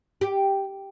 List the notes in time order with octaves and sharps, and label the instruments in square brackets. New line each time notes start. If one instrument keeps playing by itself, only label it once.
[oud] G4